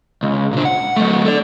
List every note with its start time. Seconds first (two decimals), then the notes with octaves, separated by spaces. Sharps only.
0.23 C#2
0.53 A#2 D4
0.65 F#5
0.97 F#3 A3
1.26 A4 D5